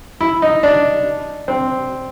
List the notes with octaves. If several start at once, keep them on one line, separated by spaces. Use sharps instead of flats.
E4
D#4
D4
C4